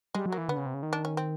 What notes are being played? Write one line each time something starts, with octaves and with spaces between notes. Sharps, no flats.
G3 G#3
F#3
A#3
E3
D3 B3
C#3
C3
C#3
D#3
D4
C#4
C4